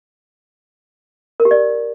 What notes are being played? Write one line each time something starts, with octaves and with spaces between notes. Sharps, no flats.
A#4
G4
D5